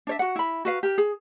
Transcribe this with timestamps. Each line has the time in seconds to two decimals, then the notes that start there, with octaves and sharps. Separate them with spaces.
0.07 D4 C#5 E5
0.19 F#4 F#5
0.36 E4 B5
0.65 F#4 B4 F5
0.83 G4 A#4
0.98 G#4